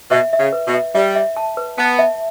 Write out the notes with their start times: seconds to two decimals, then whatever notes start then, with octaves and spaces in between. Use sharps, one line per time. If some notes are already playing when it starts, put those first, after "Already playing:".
0.11 B2 E5
0.33 E5
0.40 C#3
0.53 B4
0.68 B2
0.74 E5
0.95 G3 E5
1.16 E5
1.37 A5
1.57 B4
1.78 B3 A5
1.99 E5